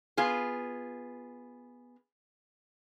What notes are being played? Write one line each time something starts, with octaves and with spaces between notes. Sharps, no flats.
B3 F4 G#4